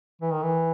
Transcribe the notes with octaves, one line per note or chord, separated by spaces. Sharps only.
E3
D#3
E3